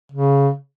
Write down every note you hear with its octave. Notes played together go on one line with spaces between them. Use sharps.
C#3